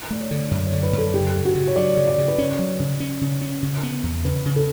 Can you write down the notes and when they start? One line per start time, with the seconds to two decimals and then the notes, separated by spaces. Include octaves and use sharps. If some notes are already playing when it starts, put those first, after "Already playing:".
0.10 A3 D5
0.21 C#5
0.31 D3
0.51 F#2 D5
0.67 C#5
0.73 D3
0.83 B4
0.93 F#2
0.98 A4
1.14 C#3 G4
1.35 C#3
1.45 F#4
1.55 C#3
1.67 C#5
1.76 F#3 D5
1.97 C#3
2.07 D5
2.18 C#3
2.28 B4
2.38 C#4 C#5
2.59 F#3
2.80 C#3
3.00 C#4
3.21 C#3
3.41 C#4
3.62 C#3
3.83 B3
4.03 E2
4.25 C#3 B4
4.45 C#3
4.56 A4